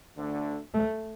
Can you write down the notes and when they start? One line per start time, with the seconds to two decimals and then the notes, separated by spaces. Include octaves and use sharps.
0.17 D2 D3 A3
0.74 A3